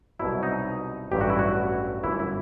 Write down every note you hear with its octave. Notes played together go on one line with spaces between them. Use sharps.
C2 B2 F#3 E4
D#4
A1 G2 F#3 G4
F#4
E4
F#4
G1 F#2 E3 E4
E4